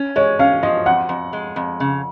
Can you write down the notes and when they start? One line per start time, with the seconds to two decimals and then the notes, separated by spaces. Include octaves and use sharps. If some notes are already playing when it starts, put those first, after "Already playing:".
Already playing: C#4
0.16 G#3 C#5
0.39 C#4 F5
0.63 F3 D#5
0.86 F2 F#5
1.09 F2
1.33 G#3
1.56 F2
1.80 C#3